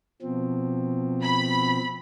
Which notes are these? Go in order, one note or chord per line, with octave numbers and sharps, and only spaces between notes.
B2 F3 C4
B5